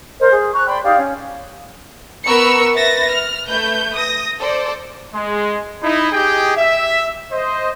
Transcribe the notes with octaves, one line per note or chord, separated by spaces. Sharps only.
A#4 C5 D#5
G#4
A#5 C#6 F#6
D5 G5 B5 C6
D#4 G4 D5 F5
C#4
B3 A#4 B5 C#6 E6 C#7
B4 E5 A6 A#6
F6
A3 B4 G6
D#6 A#6
A4 C5 D5
G#3
D#4 E4
G4 G#4 D#5 G5
E5
C5 D#5